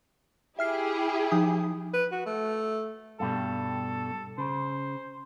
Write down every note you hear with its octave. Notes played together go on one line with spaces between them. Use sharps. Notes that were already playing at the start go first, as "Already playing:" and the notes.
E4 G4 G#4 E5 F6 C7
F3 D#4 D#6
B4
F#4
A3
G2 B2 G3 A4
C#3 C5